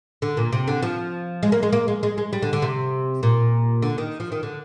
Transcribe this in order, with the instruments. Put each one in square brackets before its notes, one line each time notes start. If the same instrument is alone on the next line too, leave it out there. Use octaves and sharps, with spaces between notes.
[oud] D3
A#2
C3
D3
F3
G#3
A#3
G#3
A#3
G#3
G#3
G#3
G3
D3
D3
C3
A#2
D3
D#3
F3
D#3
D3